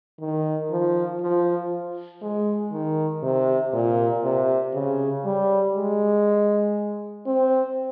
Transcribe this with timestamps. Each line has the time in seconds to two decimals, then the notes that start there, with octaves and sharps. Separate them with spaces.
0.20 D#3
0.71 F3
1.21 F3
2.22 G#3
2.72 D#3
3.23 C3
3.73 A#2
4.24 C3
4.74 C#3
5.25 G3
5.75 G#3
7.26 C4